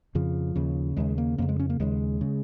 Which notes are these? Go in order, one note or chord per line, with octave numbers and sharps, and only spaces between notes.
F2 C#3 F3
D#2 C#3
D#2 C#3 G#3
A#3
F2 C#3 A#3
G#3
C#4
A#3
D#2 C#3 G#3
C#3